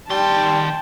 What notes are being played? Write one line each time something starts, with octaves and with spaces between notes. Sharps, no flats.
D#3 G3 G5 A5 C6